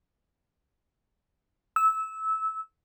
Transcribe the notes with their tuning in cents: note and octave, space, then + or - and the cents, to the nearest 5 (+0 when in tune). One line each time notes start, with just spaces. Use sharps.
E6 -20